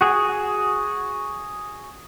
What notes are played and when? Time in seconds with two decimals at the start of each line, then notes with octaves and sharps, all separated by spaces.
0.01 F#4 G#4